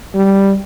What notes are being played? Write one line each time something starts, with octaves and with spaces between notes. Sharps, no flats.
G3